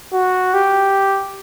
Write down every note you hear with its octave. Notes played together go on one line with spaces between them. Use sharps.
F#4
G4